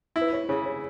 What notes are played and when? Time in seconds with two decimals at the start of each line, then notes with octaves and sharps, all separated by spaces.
0.16 E4
0.21 B4
0.33 C#5
0.49 C#3 C#5
0.66 C#5